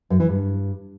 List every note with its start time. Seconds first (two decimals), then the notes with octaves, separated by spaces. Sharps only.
0.10 F#2
0.20 E3
0.29 G2